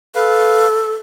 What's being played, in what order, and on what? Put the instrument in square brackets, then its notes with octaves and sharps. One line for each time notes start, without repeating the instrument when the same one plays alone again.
[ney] A4 [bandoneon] B4 F5